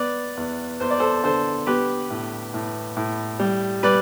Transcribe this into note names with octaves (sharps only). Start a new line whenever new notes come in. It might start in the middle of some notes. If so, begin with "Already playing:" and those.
Already playing: B3 B4 D5
E2
E2 C5
D5
A4 C5
D3 A4 C5
B3 G4 B4
A2
A2
A2
G3
G3 B4 D5